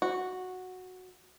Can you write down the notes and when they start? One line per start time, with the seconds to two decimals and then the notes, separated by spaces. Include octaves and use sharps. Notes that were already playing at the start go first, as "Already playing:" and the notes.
0.02 F#4